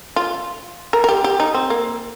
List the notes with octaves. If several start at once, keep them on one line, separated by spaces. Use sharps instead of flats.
F4
A#4
A#4
G4
G4
D#4
C4
A#3